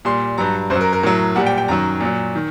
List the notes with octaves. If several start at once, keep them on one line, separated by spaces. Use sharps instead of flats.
A#2 G3 C6
G2 F#3 A#5
F#2 C5
F#3
A#4
A#4
A2 F#3 A#4
A#2 G3 F#5
G5
G5
F#2 D#3 F#3 A#5
A#2 F#3
D#3